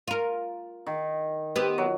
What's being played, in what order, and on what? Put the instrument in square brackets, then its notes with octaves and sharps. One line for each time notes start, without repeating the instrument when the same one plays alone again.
[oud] F4 A#4
[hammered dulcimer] D#3
[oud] B3 C4 G4
[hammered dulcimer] F#3